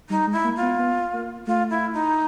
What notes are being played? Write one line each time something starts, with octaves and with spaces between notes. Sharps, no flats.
G3 D#4
G#3
E4
A#3
F4
B3
B3
A#3
A3 F4
E4
D#4